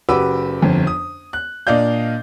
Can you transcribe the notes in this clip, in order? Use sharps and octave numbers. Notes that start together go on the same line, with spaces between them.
F#1 F#4 G4 B4 D6 E6
G1 F2
D#6
F#6
A#2 D4 D5 D#5 F5 G6